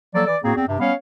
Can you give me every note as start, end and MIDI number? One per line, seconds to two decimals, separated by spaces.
0.15 0.22 53
0.15 0.22 54
0.15 0.22 58
0.15 0.22 69
0.15 0.22 74
0.27 0.38 52
0.27 0.38 74
0.44 0.54 45
0.44 0.54 58
0.44 0.54 60
0.44 0.54 66
0.44 0.54 68
0.56 0.68 40
0.56 0.68 60
0.68 0.77 43
0.68 0.77 48
0.80 0.92 55
0.80 0.92 59
0.80 0.92 61
0.80 0.92 73
0.80 0.92 77